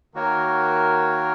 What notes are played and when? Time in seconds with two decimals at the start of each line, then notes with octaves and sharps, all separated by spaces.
0.14 D#3 A#3 F#4 A#4 C#5